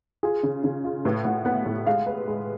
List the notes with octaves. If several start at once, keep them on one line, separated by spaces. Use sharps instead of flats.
F4 G#4
C#3
C#3
F4
A2 B4
A2 F#5
B3 F#5
A2
G#3 F5
B4
G#3